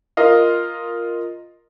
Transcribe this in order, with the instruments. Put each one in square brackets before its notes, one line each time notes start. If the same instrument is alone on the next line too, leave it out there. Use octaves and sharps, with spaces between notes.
[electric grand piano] F4 A#4 D#5 F5